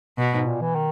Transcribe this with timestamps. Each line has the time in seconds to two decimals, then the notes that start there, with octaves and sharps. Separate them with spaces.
0.18 B2
0.32 G#2
0.46 A#2
0.61 E3
0.75 D#3